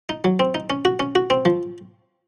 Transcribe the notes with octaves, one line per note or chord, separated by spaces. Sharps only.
D#4
F#3
C4
D#4
C#4
F#4
C#4
F#4
C4
F3